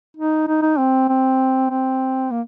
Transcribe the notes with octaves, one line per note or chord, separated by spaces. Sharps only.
D#4
D#4
D#4
C4
C4
C4
A#3